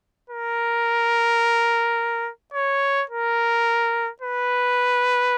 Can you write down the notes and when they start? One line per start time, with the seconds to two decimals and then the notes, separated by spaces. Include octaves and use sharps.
0.30 A#4
2.54 C#5
3.10 A#4
4.22 B4